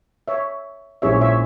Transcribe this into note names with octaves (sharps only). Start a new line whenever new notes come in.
C#5 E5
A#1 A#2 G#3 C#4 E4 C#5 E5
C#5 E5